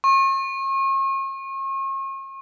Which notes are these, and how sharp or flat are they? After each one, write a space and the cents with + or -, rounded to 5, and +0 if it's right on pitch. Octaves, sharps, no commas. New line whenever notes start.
C#6 -40